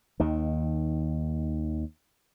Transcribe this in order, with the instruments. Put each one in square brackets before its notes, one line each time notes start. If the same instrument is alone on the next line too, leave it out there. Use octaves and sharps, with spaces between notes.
[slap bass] D#2 D#3